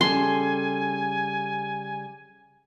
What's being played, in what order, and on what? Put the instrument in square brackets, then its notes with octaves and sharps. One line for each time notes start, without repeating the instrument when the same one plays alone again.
[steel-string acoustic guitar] C#3 G3 A4 [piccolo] G#5 [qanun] C6